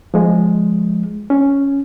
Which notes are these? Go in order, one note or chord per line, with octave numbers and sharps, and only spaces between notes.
F3 G#3
C#4